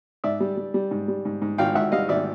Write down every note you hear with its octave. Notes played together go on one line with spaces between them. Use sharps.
G#2 D5 E5
G3
G3
G3
G#2
G3
G#2
G#2
G#1 F5 G5
G#2 E5 F#5
G3 D#5 F5
G#1 D5 E5